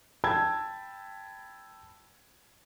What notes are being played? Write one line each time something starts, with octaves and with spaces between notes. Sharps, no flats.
G5 A5 B5 E6 G#6